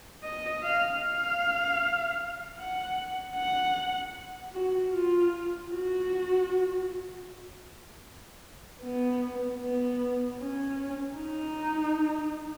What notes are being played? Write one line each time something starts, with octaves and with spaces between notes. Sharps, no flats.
D#5
F5
F5
F#5
F#5
F#4
F4
F#4
B3
B3
C#4
D#4